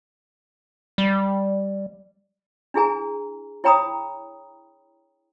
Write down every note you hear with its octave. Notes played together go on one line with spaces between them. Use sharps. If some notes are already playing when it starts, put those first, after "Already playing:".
G3
D4 E4 G#4 G#5 A#5
E4 C#5 G5 A#5 B5 D#6